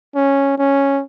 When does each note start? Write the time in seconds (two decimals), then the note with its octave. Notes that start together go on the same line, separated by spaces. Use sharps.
0.15 C#4
0.58 C#4